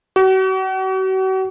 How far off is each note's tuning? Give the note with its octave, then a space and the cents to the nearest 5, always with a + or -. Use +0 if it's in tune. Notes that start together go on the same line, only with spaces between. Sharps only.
F#4 +40